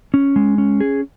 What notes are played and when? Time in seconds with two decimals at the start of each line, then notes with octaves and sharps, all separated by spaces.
0.14 C#4
0.36 G#3
0.58 C#4
0.81 G#4